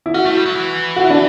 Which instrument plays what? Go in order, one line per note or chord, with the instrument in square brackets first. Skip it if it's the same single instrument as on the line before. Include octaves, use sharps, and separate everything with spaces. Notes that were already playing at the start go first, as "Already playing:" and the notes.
[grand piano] E4
[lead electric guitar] C#4 [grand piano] F#4
[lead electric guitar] A3
G3
F#3
E3
[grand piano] F#4
E4
D4